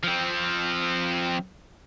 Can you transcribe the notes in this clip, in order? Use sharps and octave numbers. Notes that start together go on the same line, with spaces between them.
F3 C4